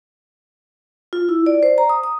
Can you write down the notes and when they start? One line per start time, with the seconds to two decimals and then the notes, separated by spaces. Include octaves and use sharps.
1.13 F4
1.29 E4
1.46 D5
1.63 C5
1.78 A#5
1.89 D#6
2.03 D#6